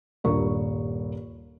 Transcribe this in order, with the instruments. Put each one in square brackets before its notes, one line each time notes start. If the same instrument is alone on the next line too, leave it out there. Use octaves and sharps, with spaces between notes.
[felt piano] D#1 G2 A#4 C#6